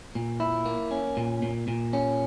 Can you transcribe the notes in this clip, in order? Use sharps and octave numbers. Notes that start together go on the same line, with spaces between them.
A#2
E4
A#3
C#4
A#2
A#2
A#2
C#4